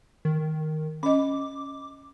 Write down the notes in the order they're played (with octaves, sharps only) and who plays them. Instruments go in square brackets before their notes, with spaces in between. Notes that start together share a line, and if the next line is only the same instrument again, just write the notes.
[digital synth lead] D#3
[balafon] C#4 D#5 [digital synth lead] D6